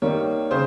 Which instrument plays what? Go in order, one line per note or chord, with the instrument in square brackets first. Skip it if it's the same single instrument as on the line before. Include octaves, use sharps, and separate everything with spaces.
[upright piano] D#3 G3 A#3 C#5
C#3 C5